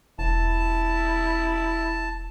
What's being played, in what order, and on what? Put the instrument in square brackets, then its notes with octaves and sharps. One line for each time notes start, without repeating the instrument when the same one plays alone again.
[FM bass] E1 [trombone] E4 [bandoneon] A5